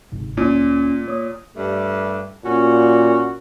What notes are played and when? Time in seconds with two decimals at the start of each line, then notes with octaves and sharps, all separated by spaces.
0.12 G1 G#2 C3
0.37 D2 A#2 C#4
1.06 A#3 C#5 D#6
1.56 G2 G3 A3
2.44 A#2 C#4 F#4